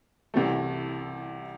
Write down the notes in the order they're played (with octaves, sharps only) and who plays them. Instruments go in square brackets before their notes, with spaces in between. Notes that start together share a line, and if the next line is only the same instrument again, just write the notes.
[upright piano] C2 C3 E3 A3